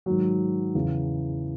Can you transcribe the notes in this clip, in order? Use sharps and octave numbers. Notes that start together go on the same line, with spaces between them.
G#2 D#3 F#3
E2 C#3 E3